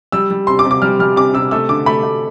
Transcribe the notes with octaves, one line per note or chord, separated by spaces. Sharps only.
G3 E6
G3
C3 C6
D6
C3
D6
G3 F6
G3 F6
C3 D6
C3 E6
A3 E6
D3 D6
A3 B5
A3